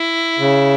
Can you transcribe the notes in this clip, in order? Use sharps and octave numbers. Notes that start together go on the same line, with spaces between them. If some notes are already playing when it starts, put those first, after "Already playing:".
Already playing: E4
C#3